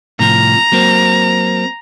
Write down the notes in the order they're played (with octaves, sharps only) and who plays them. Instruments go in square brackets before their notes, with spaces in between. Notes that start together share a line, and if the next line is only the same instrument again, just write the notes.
[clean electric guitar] A2 C3 F3 [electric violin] A#5
[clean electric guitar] F#3 A#3 C4